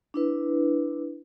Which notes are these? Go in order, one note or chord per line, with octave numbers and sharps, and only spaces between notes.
D4 E4 B4